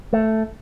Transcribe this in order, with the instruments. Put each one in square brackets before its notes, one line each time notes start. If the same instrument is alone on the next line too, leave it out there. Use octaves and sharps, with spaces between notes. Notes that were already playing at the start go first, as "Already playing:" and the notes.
[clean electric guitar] A3